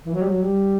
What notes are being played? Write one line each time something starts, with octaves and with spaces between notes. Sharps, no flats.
E3
F#3
G3
F#3
G3